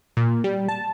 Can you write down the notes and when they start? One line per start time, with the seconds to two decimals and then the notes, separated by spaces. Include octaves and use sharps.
0.17 A#2
0.44 G3
0.68 A5